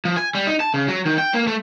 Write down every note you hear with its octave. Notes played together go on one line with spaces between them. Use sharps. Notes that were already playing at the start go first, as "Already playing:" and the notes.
F3
G#5
G3
D#4
A5
C#3
F#3
D#3
G5
A#3
A3